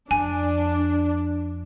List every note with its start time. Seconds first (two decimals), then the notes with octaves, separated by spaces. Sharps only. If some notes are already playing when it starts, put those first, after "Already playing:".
0.11 F2 D4 G#5